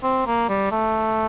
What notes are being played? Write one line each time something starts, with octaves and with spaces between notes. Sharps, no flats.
C4
A#3
G3
A3